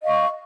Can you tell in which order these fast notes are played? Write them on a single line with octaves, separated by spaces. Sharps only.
D#5 F5 C#6